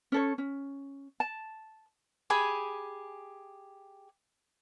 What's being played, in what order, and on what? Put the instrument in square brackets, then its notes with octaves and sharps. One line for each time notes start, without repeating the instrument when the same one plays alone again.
[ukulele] C#4 A4 C#5
C#4
A5
[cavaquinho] G4 G#4 G#5 B5